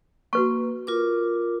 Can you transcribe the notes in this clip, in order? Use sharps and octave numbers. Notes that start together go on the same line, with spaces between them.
A#3 F#4 B4 C#6
F4 A#4 D6